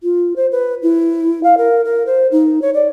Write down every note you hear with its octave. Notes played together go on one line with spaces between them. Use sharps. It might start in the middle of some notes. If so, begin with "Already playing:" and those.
F4
C5
B4
E4
F5
A#4
A#4
C5
D#4
C#5
D5